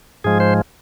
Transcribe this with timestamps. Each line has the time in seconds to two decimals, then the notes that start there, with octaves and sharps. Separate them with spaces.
0.24 G#2 F3 G#3 G#4
0.40 C5